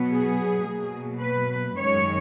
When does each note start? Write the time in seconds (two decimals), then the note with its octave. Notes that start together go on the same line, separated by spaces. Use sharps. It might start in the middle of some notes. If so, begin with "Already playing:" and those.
Already playing: B2 F#3 B3
0.11 G#4
0.66 B2 F#3 A#3
1.21 B4
1.78 F#2 D#3 G#3 C#5